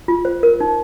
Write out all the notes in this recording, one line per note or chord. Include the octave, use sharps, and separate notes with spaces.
F4
C5
A#4
D#4